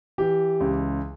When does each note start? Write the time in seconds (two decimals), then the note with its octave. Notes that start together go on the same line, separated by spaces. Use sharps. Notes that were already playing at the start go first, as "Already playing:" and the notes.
0.18 E3 G4
0.60 C#2